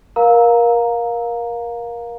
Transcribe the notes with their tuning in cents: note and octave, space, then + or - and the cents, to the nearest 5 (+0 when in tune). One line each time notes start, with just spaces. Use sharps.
A#4 +20 F5 +15 A#5 +0